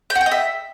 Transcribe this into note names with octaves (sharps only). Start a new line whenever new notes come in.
G5
F#4
G5
D#5
E5